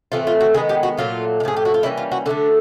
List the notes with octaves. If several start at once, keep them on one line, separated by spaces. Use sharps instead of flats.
A2 E3 A3 C4 F4
F4
F#4
D#3 G#3 B3 G#4
G4
F#4
A#2 F#3 A3 F4
G#3
A2 F3 G#4
G4
F#4
F4
E3 G3 A#3 C#4 E4
F4
F#4
D3 F#3 A3 D4 F#4